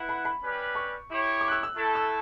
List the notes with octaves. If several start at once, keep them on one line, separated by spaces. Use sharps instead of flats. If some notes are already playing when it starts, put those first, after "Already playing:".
Already playing: E4 B4 F#5
B5
B5
G3 C#4 G4 B4
C#6
E4 G4 C#5
D6
F#6
E6
E6
A3 E4 A4
E6